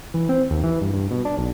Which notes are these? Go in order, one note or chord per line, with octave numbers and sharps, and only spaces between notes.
E3
C4
D#2
E3
G2
G2
B2
D4
B1